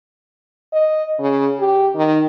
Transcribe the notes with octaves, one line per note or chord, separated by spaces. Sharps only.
D#5
C#3
G4
D#3